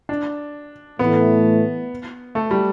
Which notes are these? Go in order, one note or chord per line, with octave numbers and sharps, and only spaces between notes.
D4
A2 E3 A3 B3
A3
G3